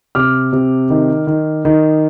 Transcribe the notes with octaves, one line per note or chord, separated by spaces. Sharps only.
C3 D6 F6
C3
D#3
D#3
D#3